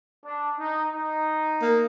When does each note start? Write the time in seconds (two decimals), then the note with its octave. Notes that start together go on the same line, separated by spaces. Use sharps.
0.25 D4
0.59 D#4
0.93 D#4
1.62 A#3